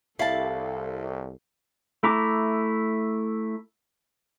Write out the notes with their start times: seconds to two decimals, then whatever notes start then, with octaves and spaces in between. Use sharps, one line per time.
0.19 C2 E4 A4 F5 A5
2.03 A3 E4 A#5 D6